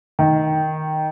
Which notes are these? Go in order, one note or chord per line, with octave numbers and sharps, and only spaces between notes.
D#3